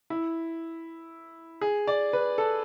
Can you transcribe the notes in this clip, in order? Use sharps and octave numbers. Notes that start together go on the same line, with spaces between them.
E4
G#4
D5
B4
A4